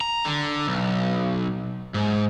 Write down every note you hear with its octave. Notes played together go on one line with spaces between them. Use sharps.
A#5
D3
B1
G#2